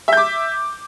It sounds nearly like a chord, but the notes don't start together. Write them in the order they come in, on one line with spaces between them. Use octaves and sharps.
E5 G6 D6